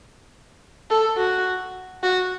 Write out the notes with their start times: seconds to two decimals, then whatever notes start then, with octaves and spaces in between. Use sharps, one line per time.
0.90 A4
1.18 F#4
2.03 F#4